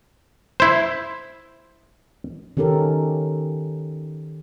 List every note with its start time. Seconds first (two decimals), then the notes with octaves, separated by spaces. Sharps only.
0.60 E4 C5
2.57 D#3 C#4 G4 A4 A#4